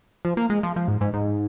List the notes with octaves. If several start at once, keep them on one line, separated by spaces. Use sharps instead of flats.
F3
A#3
G#3
F3
F3
G#2
G#2
G#2